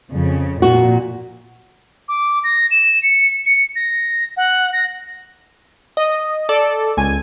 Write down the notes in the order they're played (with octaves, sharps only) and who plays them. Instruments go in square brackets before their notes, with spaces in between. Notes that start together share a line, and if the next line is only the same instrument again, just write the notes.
[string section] F2 C#3
[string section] A#2 [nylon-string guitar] F#4
[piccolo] D6
A#6
E7
C#7
C#7
A#6
F#5
A#6
[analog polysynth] D#5
A4 D5
C#2 G#5